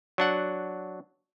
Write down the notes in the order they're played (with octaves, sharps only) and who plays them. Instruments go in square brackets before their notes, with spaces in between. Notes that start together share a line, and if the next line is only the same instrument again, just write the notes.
[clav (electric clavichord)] F#3 D4 F#5